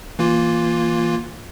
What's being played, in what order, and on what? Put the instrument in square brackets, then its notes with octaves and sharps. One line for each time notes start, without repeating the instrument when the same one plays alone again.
[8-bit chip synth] E3 A#3 F4